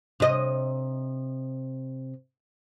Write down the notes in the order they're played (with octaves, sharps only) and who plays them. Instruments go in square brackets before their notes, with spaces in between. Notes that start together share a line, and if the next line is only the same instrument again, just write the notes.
[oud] C3 D#5